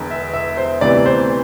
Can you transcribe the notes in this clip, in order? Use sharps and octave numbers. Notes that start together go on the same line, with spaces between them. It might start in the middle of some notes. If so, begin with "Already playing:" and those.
Already playing: E1 E2 D3
E5
E5
C5
D2 C3 E3 B3 D5
C5